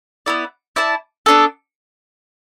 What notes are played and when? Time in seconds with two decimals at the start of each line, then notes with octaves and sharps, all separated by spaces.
0.26 B3 E4 D5
0.76 E4 D5 A5
1.26 B3 D4 A4